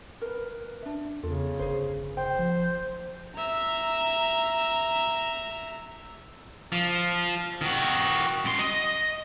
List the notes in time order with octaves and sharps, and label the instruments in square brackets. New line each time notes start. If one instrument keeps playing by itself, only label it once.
[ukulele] A#4 B4
D4 E5
[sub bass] E2 [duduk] C#3 [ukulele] F4 A4
[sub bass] G1 [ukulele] G#4 C5
[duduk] C5 [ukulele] G5
[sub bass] F3
[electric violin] E5 A#5
[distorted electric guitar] F3
D#3 F#4
F#2 C6
D#5